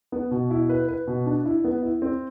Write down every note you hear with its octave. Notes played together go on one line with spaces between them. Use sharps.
B3
B2
E4
B4
B4
B2
D4
E4
B3
E4
C4